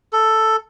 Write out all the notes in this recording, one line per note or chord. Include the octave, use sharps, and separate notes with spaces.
A4